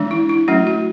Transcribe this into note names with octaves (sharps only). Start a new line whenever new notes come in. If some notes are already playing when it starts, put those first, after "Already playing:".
Already playing: E3 G#3 D4
E4
E4
F#3 A3 C#4 F#4
F#4